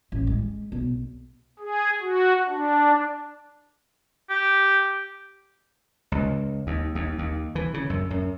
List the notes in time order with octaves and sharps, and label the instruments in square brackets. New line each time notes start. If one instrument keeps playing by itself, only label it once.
[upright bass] A1
G#3
B1
[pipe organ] G#4
F#4
D4
[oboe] G4
[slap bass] C#2
D#2
D#2
D#2
E3
C#3
F#2
F#2